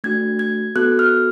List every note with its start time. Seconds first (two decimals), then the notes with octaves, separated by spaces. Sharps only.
0.04 A3 D4 F#4 G#6
0.39 G#6
0.76 B3 F#4 A4 F#6
0.99 F6